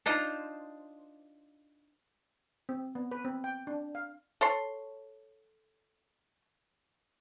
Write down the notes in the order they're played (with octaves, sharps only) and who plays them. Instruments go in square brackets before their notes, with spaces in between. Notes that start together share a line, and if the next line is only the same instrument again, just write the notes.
[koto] D4 D#4 F4 C5 D#5
[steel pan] C4
B3
B4
C4
G5
D4
F5
[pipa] A4 C#5 C6